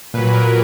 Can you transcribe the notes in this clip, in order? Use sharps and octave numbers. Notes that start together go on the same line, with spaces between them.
A#2 F#3 B4
A#4